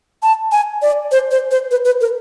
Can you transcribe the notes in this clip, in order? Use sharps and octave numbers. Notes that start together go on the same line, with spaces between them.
A5
G#5
D5
C5
C5
C5
B4
B4
A#4